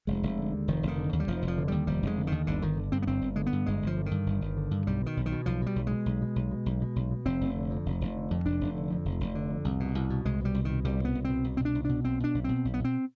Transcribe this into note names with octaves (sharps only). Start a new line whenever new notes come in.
F1 G#3
F1
D3
D#2
F1 D#3
F1
D#3
D3
D#2
G3
F1 F3
F1
F3
D3
D#2 G3
F1 G3
F1 G#3
D3
D#2 D#3
G1 D3
G1 D#3
D3
G2 C4
B3
G1 C4
G1
D3 G#3
B3
G2
G1 G#3
G1 F3
D3
D#3
G2
G1
G1
D3
G2
B1 G3
B2
D#3
B1
D#3
B2
B1 F3
B2 G3
B1
B2 G#3
B1
B2
B1
B2
B1
B2
B1
B2
F1 C4
F1
D3
F2
F1
F1
D3
F2
F1 D4
F1
D3
F2
F1
F1
D3
F2
C2
B2
C2
B2
C2 G#3
B2 G3
C2
B2 D#3
C2 G3
B2 B3
C2
B2 C4
C2
C4
B2 D4
C2
B2 D4
B1 C4
B2 D4
B1
B2 C4
B1
B3
B2 C4